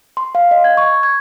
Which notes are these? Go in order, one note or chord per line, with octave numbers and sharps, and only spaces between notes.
C6
F5
D#5
G#6
C#6
G#6